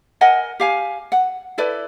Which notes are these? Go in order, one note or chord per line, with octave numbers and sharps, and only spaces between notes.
A#4 D#5 F#5 G#5
G4 F5 G#5
F#5
E4 A4 B4 D5